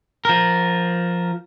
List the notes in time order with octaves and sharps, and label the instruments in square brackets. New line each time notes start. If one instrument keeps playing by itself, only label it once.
[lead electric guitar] F3 A#4